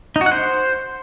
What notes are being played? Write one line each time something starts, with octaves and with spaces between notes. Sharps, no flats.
D#4
F#4
F#5
C5